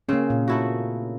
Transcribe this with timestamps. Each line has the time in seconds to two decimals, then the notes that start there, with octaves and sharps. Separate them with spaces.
0.09 C#3 A#3 C4 C#4
0.30 A#2
0.48 A3 E4 F#4